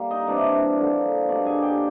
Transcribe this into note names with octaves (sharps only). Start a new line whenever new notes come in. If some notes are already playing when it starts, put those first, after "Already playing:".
Already playing: G3 A#3
D#4 D#5
C3 E3 G3 D4 D5
D3 F3 A#3
B2 G3 A#3 D4 D5
G#4 G#5
G4 G5